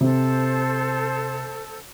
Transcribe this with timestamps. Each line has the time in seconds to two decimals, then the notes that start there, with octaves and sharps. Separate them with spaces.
0.01 C3 A4 C5